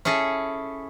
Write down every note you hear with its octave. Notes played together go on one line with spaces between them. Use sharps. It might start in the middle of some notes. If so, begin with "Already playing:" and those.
C#4 E4 G#4 A4